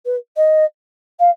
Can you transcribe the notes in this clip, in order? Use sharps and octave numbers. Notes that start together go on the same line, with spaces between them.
B4
D#5
F5